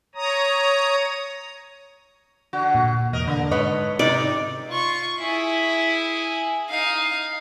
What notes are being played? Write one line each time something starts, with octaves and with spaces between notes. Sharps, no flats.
C#5 A#5 D#6
D3 F#4
A#2
E1 A#4 D#5
D3 A#3 D4
G#2 A4 B4 C#5 D#5
C3 D#4 D5
F4 C#6
E4 G#4
D#4 F5